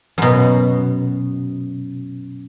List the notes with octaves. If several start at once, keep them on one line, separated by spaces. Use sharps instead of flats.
F#2 B2